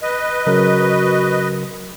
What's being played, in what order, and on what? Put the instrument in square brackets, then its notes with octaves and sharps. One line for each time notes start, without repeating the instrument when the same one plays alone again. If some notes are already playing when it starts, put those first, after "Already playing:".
[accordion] B4 D#5
[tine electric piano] C#3 F#3 A#4 [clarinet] F#4